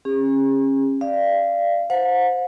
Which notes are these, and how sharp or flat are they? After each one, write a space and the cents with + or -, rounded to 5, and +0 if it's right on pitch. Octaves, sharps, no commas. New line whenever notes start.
C#4 -30 G#4 -40
D5 +10 F5 -25
C5 +0 F#5 -45